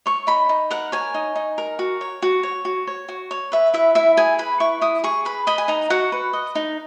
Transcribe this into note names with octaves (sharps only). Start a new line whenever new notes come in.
C#5 C#6
D#4 B5
D#4
A#4 F#5
C#5 G#5
D#4
D#4
A#4
F#4
C#5
F#4
C#5
F#4
C#5
F#4
C#5
B4 E5
E4 E5
E4 E5
G#4 G#5
B4 B5
E4 C#6
E4 D#6
G#4 C#6
B4 B5
D#5 B5
G#5
D#4 A#5
F#4 F#5
B4
D#5
D#4